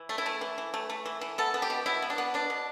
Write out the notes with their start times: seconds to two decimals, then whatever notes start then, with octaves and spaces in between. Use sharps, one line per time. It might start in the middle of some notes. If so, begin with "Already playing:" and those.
Already playing: E3
0.09 A3
0.18 E4
0.26 A3
0.41 E3
0.58 E3
0.74 A3
0.90 A3
1.06 E3
1.21 E3
1.38 B3 A4
1.54 B3
1.62 G4
1.70 B2
1.86 B2 E4
2.02 B3
2.10 D4
2.18 B3
2.34 B2 D4
2.50 B2